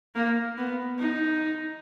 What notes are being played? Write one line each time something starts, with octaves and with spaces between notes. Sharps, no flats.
A#3
B3
D#4